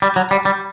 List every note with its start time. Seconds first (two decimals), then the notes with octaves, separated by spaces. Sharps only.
0.02 G3
0.16 F#3
0.31 G3
0.45 G3